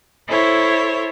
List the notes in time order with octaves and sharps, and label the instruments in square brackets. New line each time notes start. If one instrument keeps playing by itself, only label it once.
[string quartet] E4 A4 C5 C#5